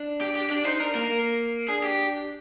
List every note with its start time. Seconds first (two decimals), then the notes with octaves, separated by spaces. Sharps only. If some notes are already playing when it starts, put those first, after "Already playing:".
Already playing: D4
0.21 G4
0.35 G4
0.50 D4 G4
0.65 D#4 C5
0.80 D4 A#4
0.95 A#3 A#4
1.09 A#3
1.68 D4 G#4
1.84 G4